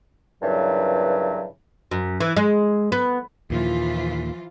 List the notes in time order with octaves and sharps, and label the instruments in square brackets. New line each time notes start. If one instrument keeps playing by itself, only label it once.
[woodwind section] G2 A#2 C#3 E3 F#3
[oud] F#2
E3
G#3
B3
[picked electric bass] D#2 A#2 [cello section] E3 F3 F4